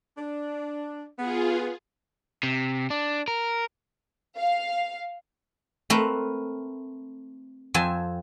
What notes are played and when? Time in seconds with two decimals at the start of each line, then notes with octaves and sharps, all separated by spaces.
0.18 D4
1.18 B3 F4 G#4
2.43 C3
2.90 D4
3.28 A#4
4.37 F5
5.90 A3 C4 A#4 B4
7.74 F2 C4 G#5 A5